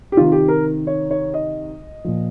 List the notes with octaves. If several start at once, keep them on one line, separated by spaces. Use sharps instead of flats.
G4
C3 D#3 F4
G4
A#4
C#5
C#5
D#5
A#2 F3